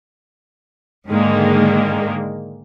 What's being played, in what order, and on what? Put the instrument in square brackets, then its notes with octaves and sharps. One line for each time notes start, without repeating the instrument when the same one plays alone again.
[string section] G#2 D3 D#3 G#3 A#3